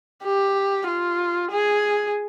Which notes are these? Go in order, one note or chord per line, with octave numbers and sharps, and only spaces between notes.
G4
F4
G#4